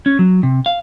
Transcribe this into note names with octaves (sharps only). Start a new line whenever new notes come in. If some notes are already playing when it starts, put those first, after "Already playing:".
C#4
F#3
C3
F5